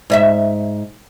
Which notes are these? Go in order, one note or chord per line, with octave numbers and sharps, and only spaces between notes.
G#2 D#5 E5